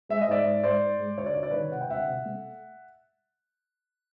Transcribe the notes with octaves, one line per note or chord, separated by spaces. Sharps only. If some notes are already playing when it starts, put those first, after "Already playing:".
G#3 E5
D#5
G#2 D5 E5
G#2
G#2 C5 D5
G#2
G#3
D2 C#5
D5
D2 C#5
D5
D#3 B4 C#5
C3 F#5
G5
D2 E5 F#5
C3
A3